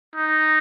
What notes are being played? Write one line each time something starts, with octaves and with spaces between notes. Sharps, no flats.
D#4